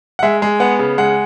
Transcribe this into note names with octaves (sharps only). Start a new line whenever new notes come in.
F#5
G#3 E5
G#3
B3 F#5
C#3
G#3 F#5